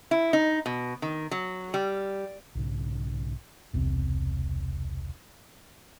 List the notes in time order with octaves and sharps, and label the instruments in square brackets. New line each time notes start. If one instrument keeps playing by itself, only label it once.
[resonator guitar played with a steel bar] E4
D#4
B2
D#3
F#3
G3
[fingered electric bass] B1 G#2 C#3
E1 C2 C3